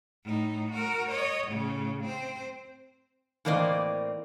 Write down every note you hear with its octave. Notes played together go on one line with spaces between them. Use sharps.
A2 D#4
F#4 A#4
C#5 D#5
A2 C#3
C4 C5
A2 E3 A#3 C4 D5 D#5